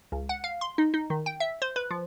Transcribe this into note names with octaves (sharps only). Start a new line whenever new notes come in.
C#2
F#5
F5
C6
D#4
D#4
D#3
G5
E5
C5
B4
F3